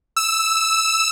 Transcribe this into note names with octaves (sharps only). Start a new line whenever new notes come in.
E6